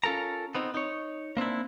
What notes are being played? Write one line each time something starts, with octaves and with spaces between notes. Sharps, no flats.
C#4 F4 A4 A#4 A#5
B3 C4 D#4
D#4 C#5
A#3 C4 D4 E4